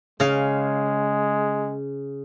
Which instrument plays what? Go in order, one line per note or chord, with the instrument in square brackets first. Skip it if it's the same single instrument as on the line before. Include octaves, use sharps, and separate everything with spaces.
[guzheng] C#3 F5 [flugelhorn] G#3